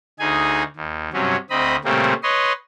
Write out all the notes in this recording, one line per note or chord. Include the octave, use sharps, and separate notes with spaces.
D2 D#4 G#4 G#5
D#2
G2 C3 F#3 C#4
D2 C4 D#5 B5
A#2 C#3 G3 A3 A#3 C4
B4 C#5 D#5 C6